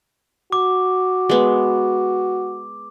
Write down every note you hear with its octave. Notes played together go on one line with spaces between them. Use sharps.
F#4 D6
G#3 B3